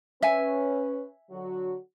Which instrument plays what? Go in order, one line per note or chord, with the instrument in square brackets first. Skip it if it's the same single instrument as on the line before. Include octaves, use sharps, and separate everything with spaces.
[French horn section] C#4 B4 [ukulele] E5 G#5
[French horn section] D3 F#3 F#4